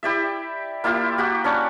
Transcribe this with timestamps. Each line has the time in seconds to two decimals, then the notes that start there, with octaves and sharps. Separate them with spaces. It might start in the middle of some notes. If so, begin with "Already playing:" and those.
0.03 E4 G4 D5 E5
0.84 A#3 E4 F4 G4
1.18 F#4 G4 F#5
1.44 C#4 D4 C#5